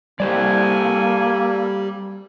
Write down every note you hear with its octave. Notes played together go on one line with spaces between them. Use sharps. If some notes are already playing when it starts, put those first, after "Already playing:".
G3 A#3 G4 A4 C5 D5 G#5